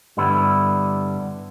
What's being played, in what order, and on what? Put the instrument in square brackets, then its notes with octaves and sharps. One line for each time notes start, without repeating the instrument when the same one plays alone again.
[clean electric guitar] G2 D3 G3 B3 E4